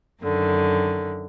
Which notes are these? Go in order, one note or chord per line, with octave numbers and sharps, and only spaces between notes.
F#2 D3 D#3